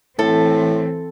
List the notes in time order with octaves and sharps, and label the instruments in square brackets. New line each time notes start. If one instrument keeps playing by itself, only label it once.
[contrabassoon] A2 [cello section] E3 C4 [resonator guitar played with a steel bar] A4